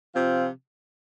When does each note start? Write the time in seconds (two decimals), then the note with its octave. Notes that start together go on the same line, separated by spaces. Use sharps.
0.14 C3 F3 C4 F4